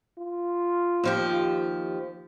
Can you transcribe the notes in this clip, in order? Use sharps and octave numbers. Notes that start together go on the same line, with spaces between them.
F4
D#2 F3 G4